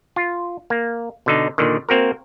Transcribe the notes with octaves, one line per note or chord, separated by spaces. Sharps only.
F4
A#3
B2 D3 D#4
A#2 D3 D#3
A#3 C4 F#4 A#4